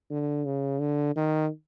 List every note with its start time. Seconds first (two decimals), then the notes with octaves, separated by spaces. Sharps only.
0.11 D3
0.45 C#3
0.80 D3
1.16 D#3